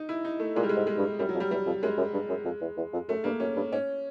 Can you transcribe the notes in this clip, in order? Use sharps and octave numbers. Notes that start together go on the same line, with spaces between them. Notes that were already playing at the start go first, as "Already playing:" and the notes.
Already playing: D#4
E4
D#4
A3
A#2 G#3
G3
G#3
G#2
G#3
G2
F#2 G3
F#3
F2
G3
E2 G3
F2
F#2 G#3
F#2
G2
F#2
F2
E2
E2
F2
F#2 A3
G2 A#3
F#2 C#4
G2
G#2 C#4